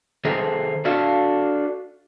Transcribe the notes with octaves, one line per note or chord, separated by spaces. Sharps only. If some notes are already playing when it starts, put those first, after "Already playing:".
D#3 G#4 A4 C5 E5 A#5
D4 F#4 A4 E5 F5